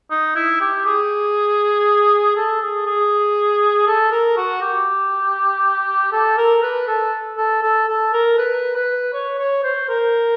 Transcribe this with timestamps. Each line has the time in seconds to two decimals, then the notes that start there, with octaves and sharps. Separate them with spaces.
0.11 D#4
0.36 E4
0.61 G4
0.86 G#4
2.36 A4
2.62 G#4
2.86 G#4
3.87 A4
4.11 A#4
4.37 F#4
4.62 G4
6.12 A4
6.38 A#4
6.63 B4
6.88 A4
7.37 A4
7.63 A4
7.88 A4
8.13 A#4
8.38 B4
8.76 B4
9.13 C#5
9.39 C#5
9.64 C5
9.89 A#4